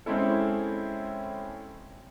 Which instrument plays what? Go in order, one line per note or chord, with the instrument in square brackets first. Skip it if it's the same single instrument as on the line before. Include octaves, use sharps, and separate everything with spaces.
[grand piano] G#3 C4 C#4 E4 A4